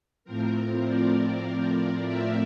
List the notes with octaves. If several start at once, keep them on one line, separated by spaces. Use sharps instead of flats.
A2 F3 C4 A#4
D5
E5